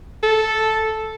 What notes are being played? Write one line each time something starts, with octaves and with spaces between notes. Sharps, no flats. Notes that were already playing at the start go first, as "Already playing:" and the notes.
A4